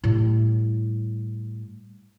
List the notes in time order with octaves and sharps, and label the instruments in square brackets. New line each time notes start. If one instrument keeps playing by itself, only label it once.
[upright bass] A2 G3